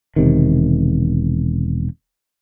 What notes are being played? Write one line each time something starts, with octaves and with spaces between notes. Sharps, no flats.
E1 C3 D#3